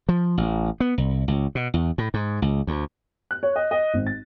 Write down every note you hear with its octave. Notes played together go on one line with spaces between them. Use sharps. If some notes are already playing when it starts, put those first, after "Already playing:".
F3
A1
B3
C2
C#2
B2
E2
A2
G#2
C#2
D2
F#6
C#5
D#5
D#5
G#1
A6